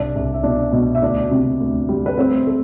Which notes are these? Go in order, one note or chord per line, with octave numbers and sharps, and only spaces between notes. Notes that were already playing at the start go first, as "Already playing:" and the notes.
Already playing: C2 D4 D5
C2
E5
B2 D4 D5
B2
E5
D2 D4 D5
C3
D2
G3
B4
A3 C4 C5
A3